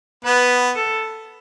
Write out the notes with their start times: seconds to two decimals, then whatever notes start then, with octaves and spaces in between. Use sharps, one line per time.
0.24 B3 B4
0.76 A4